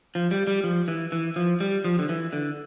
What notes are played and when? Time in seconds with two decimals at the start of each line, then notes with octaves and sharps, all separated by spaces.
0.15 F3
0.31 G3
0.47 G3
0.64 F3
0.88 E3
1.12 E3
1.36 F3
1.60 G3
1.85 F3
1.99 D3
2.09 E3
2.33 D3